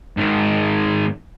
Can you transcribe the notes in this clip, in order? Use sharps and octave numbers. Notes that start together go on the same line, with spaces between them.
G#2 D#3